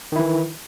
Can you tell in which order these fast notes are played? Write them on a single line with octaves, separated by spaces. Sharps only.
D#3 E4 E3